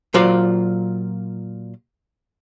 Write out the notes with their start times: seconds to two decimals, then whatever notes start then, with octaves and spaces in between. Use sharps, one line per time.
0.14 A#2 F#3 F4 C5 D5 F5